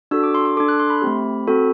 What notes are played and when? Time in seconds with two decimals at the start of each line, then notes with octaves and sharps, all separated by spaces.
0.11 D4 F#4 A4 E6
0.23 D6
0.35 C6
0.45 C6
0.57 D4 A4 D6
0.68 F#6
0.79 C6
0.90 B5
1.02 A3 C4 G4
1.47 C4 F#4 A4